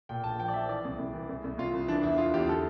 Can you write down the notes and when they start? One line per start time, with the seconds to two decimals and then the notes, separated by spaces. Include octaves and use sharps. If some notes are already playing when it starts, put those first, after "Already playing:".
0.09 A#2 G5
0.24 A#1 A5
0.40 F3 G5
0.48 D5
0.54 F3 E5
0.68 E3 D5
0.84 C2
0.99 C2
1.13 E3
1.28 C2
1.43 C2
1.58 C2 F4
1.74 C2
1.88 E3 D4
2.03 E2 E4
2.18 E3 F4
2.33 E2 G4
2.48 D3 A4